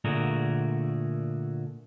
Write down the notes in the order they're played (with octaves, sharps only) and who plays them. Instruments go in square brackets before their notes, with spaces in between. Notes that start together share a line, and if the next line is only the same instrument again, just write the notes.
[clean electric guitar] A#2 D3 A3 F#4 G#4 A#4